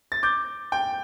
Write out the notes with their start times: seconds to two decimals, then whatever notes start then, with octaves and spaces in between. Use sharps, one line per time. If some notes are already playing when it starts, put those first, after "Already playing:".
0.12 A6
0.23 D6 G6
0.72 G5